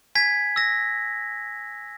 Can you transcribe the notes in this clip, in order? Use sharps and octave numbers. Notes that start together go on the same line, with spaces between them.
G#5 G#6 B6
E6 A#6